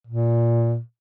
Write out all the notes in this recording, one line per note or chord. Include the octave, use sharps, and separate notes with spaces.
A#2